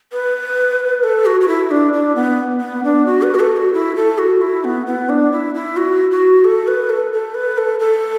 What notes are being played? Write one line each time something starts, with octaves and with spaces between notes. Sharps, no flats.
B4
A4
F#4
F#4
E4
D4
D4
B3
B3
D4
F#4
B4
F#4
A4
F#4
E4
A4
F#4
E4
B3
B3
D4
E4
E4
F#4
F#4
A4
B4
A4
A4
B4
A4
A4